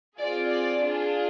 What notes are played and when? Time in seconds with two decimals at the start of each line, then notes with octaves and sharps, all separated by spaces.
0.17 C4 F4 G#4 D5
0.49 D5
0.81 D4 F4 G#4